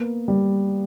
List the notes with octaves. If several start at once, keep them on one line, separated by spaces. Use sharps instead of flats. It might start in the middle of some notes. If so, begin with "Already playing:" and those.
Already playing: A#3 B3
G3